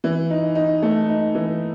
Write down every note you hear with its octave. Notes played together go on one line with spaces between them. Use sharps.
E3
D#4
D#4
A3
D#4
E3